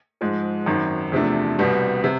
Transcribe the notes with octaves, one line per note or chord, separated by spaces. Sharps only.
G#2 F3 G#3
G#1 F#2 D#3
E2 C3 F3 A3 D4
C2 B2 G3 B3
C3